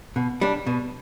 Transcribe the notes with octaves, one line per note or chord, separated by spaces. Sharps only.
B2
G3 D4
B2